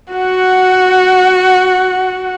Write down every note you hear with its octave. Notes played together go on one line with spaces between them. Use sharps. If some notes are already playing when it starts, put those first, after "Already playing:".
F#4 F#5